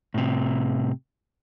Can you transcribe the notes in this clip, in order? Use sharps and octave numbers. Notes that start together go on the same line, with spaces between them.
A2 C3